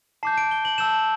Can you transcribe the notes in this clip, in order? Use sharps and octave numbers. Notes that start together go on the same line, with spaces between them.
A5 D6 G6 C7
D7
G7
F#7
A5 E6 G6 E7
F#7